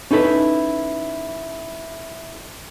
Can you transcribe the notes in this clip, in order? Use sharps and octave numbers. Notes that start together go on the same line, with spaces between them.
C#4 D#4 E4 A4 B4